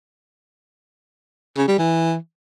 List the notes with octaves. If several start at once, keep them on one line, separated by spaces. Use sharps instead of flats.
C#3
G3
E3